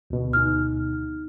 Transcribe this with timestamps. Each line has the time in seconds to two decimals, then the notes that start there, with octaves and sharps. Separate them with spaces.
0.10 D2 B2
0.33 D#4 F6